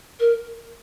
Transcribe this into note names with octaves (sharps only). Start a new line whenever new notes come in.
A#4